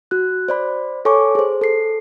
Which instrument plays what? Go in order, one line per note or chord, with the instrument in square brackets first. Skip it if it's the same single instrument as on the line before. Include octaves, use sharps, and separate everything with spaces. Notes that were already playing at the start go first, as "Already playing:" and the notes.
[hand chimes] F#4 F#6
C5 D5 B5
A4 C#5 G#5 C#6 D6
G#4 C5
A4 C7